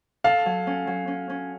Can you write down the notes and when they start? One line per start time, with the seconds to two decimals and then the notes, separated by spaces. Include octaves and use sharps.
0.24 A4 F5
0.46 F#3
0.67 C#4
0.87 F#3
1.07 C#4
1.30 C#4